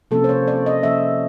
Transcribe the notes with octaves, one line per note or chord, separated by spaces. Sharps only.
C3 F3 A#3 C#4 A4
C5
C#5
D5
D#5
C3 F3 A#3 C#4 E5